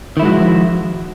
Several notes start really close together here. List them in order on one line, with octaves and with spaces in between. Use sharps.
D#3 E4 G#3 F#4 F3